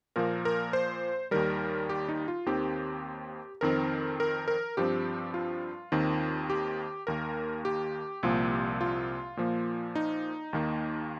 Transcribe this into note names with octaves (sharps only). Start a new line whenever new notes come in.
A#2 F3 A#3 A#4
A#4
C5
D#2 D#3 G3 A#4
G4
D#4
F4
D#2 D#3 C4 G4
F2 D#3 C4 A#4
A#4
A#4
G2 F3 C4 G4
F4
D#2 D#3 C4
G4
D#2 D#3 A#3 A#4
G4
C2 A#2 F3 A#3
F4
A#2 F3 A#3
D#4
D#2 D#3 A#3